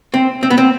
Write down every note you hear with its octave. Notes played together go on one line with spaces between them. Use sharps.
C4
C4
B3
C4